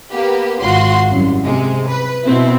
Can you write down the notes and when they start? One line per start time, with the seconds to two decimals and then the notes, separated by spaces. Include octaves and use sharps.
0.11 A#3 B3 G4
0.62 G#1 F4 F#4 C6
1.08 C2 F#2
1.44 C3 G#3
1.87 B4
2.24 B2 C4 E4